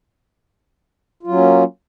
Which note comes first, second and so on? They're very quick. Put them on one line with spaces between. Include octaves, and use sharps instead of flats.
F4 F#3 C#4 A#3